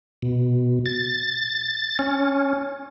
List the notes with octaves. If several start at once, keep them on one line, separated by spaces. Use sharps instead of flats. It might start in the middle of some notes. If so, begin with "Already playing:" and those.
B2
A6
C#4